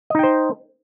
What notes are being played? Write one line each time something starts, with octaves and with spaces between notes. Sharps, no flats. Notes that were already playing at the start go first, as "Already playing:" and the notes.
D#4 C5 D#5 G5